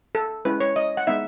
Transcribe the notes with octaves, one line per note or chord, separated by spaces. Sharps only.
A4
G#3 C#4 E4 B4
C#5
D#5
F#5
G#3 B3 D#4 E5